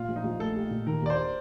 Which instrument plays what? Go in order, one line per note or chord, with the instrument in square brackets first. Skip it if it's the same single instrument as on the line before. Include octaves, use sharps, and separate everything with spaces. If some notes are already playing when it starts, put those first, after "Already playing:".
Already playing: [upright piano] A#2 [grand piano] F4
[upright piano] A#1
[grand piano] D#4
[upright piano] A#1
[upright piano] A3 [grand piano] A4
[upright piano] G4
A#2
[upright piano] D#3 [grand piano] A#4
[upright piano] D#2 [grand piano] D5
[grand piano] C5